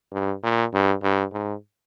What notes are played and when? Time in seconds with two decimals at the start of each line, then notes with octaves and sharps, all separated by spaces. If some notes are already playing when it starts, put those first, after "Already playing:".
0.13 G2
0.44 A#2
0.74 G2
1.03 G2
1.33 G#2